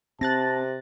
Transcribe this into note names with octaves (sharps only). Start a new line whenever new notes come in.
C3 C4 A5 F#6 A6 A#6